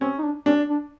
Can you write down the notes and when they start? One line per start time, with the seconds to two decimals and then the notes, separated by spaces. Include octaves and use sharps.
0.01 C4 C#4
0.18 D#4
0.24 D4
0.46 C#4 D4
0.70 D4